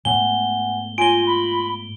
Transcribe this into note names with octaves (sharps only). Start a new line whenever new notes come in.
G#2 A3 B3 F#5 G#5 G7
F4 G#5 A#6 D7 G7
B5